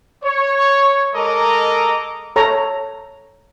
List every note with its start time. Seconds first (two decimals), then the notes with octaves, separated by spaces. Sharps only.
0.24 C#5
1.15 G#3 A4 A#4 D#5 A#5 D6
2.36 A4 C#5 A#5